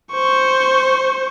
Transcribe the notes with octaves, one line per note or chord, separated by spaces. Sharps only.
C5 C#6